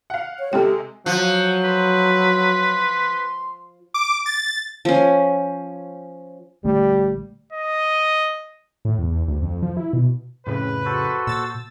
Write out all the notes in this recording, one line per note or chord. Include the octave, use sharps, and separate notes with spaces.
F5 F#5
C#5
C3 G#3 G4 A4 G5
F3 F#3 F#5
B4 C6
D6
A6
F3 C#4
A#1 D3 G3 A3
D#5
A2
E2
E2
D2
F2
F3
E4
B2
F2 A2 C#3 B4
F#4 A4 C5
A#2 E6 A6